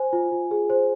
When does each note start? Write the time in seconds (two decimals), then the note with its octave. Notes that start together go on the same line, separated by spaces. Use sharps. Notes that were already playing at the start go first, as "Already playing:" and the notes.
Already playing: C5 G#5
0.13 F4
0.32 F4
0.51 G#4
0.70 C5